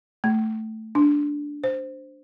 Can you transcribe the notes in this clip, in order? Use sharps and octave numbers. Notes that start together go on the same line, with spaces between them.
A3
D4
C5